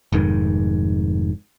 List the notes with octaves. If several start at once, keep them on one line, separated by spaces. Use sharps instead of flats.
F1 F2 G#2 D#3